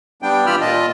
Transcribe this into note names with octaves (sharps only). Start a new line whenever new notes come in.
G3 B3 D4 G5
E3 F4 G4 B5 E6 F6
A#2 F4 D#5 A5